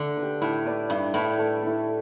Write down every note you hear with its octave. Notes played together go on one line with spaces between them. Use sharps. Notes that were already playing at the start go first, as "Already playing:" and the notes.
Already playing: D3 A3 D4 A4
B4
G4
A2 E4
B4 D5
G2 E4
A2 B4 E5
A3
E4 A4